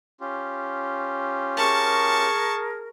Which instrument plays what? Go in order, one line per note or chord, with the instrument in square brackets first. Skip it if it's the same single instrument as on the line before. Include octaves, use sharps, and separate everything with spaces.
[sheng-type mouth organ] C#4 F4 G4
[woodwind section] G#4 A#4 [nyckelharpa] A5 C#6